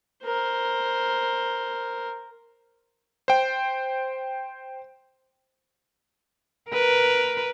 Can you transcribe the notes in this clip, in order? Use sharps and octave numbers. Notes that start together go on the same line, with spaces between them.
A#4 C5
C5 G5
A#4 B4